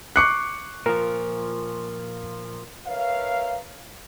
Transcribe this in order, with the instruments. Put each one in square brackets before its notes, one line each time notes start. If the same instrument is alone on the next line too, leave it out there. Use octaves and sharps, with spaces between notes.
[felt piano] C#6 D6 C7 [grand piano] F#6 C#7
[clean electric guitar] A#2 F3 [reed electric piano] A#4
[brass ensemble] A#4 B4 C#5 E5 F5